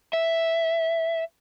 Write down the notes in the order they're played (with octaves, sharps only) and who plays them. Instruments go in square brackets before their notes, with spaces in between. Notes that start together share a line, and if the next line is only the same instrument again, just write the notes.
[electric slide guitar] E5